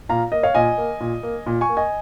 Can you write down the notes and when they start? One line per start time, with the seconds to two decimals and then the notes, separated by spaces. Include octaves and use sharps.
0.09 A#2 F5 A#5
0.32 A#3 D#5
0.43 C#5 F5
0.55 A#2 D#5 G#5
0.78 A#3
1.00 A#2
1.23 A#3
1.46 A#2
1.61 G#5 C#6
1.69 A#3
1.77 D#5 G#5